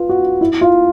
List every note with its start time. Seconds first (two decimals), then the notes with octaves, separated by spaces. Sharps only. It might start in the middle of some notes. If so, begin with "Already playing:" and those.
Already playing: F4 B4
0.09 F#4
0.41 E4
0.61 F4